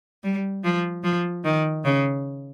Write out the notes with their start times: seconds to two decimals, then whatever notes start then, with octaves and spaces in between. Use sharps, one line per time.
0.24 G3
0.64 F3
1.04 F3
1.44 D#3
1.84 C#3